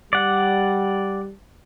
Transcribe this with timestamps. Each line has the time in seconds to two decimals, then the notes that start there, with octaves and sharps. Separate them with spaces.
0.13 G3 D5 F#5